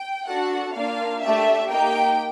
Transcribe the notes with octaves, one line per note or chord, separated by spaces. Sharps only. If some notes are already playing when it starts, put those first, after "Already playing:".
Already playing: G5
D4 F#4 A4 F#5
A#3 D4 F4 F5
A3 D4 G4 E5
A#3 D#4 G4 G5